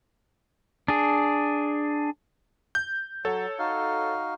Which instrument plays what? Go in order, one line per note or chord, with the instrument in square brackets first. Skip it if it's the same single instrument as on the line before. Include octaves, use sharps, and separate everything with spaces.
[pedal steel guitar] D4 G#4
[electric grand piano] G6
[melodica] F#3 [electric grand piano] A4 C#5
[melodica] D#4 F#4 F5